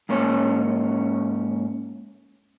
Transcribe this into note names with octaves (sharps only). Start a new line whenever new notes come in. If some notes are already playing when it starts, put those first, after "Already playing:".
G#2 A#3 C#4 C#5